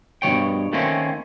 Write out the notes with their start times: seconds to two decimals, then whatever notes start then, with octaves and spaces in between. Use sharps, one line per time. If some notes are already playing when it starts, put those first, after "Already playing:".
0.22 G2 B2 E3 C#5 G5
0.73 D#3 A3 A#3 C4 C#4